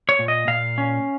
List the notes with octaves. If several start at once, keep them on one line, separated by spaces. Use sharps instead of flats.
C#5
A#2
D#5
A#2 F5
C#4